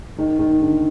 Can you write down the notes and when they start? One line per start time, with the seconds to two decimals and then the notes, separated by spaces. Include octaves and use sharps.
0.18 D#3
0.39 D#3
0.61 D3